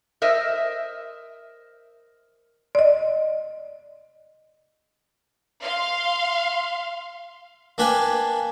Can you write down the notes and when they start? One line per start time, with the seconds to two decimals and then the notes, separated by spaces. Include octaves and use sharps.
0.22 A#4 C5 D#5 E5
2.75 D5 D#5
5.61 F5 C6
7.78 A#3 D4 B4 G5 G#5